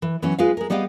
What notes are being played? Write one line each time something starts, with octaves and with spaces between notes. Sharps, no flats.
E3
E3 F#3 B3 C#4
G#3 F4 B4 F5
G#3 A#4
G3 B3 D#5 F5 G5